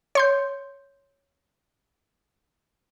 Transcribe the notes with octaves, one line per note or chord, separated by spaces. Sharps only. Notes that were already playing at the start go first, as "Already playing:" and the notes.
C#5 C6 G6